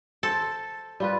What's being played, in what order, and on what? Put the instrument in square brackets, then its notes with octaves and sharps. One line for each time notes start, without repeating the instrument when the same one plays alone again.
[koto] A4 [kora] C5
[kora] G3 F4 B4